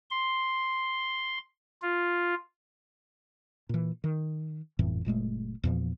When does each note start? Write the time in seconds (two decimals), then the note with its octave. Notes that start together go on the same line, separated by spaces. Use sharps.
0.11 C6
1.82 F4
3.69 A#2 E3
4.04 D#3
4.79 G1 F2 A2 E3
5.05 F#1 A#2 G#3 A3
5.64 E2 A#2 F3